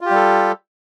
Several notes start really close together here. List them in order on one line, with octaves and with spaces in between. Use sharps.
F4 G4 G3 A4